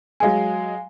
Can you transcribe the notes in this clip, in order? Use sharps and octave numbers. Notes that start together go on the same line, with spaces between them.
F#3 G#3 G#4 F5 G#5